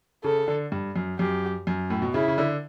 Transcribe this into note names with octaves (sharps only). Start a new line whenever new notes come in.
C#3 A4
D3
G2
F#2
F#2 G4
F#2
A2
B2
C#3 E4
C#3
D3